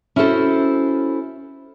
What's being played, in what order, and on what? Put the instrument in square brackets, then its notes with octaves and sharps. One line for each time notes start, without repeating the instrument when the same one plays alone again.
[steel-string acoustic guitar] C#4 E4 F#4 G#4 A4 C5